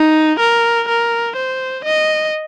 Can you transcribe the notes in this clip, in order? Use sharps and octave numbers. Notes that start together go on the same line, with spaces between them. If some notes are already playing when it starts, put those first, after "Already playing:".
Already playing: D#4
A#4
A#4
C5
D#5